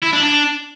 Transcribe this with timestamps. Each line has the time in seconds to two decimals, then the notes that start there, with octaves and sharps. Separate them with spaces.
0.02 E4
0.13 D4
0.23 D4